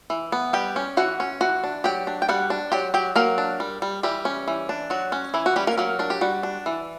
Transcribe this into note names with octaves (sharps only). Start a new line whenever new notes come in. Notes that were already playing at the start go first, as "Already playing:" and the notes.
E3
B3
G3 G4 G5
C#4
E3 F#4 F#5
C#4
E3 F#4 F#5
D4
F#3 G4 G5
D4
G5
G3 F#4 F#5
D4
F#3 G4 G5
F#3 G4 G5
F#3 A#3 A#4
D4
G3
G3
E3 G3 G4
C#4
E3
D4
F#3 F#4
C#4
E3 E4
F#4
G3 C#4 G4
A#3 A#4
F#3 A#3 A#4
D4 A#4
G4
G3 F#4
D4
E3